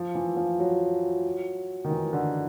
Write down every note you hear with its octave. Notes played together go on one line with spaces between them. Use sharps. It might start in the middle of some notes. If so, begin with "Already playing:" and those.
Already playing: F3
E3
F3
F#3
D#3
E3
D3